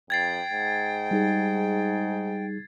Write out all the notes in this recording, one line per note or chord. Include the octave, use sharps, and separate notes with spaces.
F2 G5 G#6 A6 C7
G#2
G3 D#4 G#4